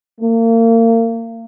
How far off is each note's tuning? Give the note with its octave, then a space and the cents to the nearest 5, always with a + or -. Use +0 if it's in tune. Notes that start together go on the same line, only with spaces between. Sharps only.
A#3 -35